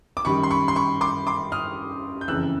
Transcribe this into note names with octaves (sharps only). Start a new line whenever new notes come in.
D6
F#2 D#3 G3 B5 C#6
C6
B5 C#6
C6
B5 C#6
C6 D6
C6 D6
D#6 F6
G6
F#1 F2 C#3 E3 E6 F#6